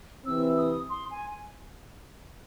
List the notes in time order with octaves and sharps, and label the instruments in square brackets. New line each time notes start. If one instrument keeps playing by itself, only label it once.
[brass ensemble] C3 E3 C4 [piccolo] E6
[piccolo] D#6
C6
G#5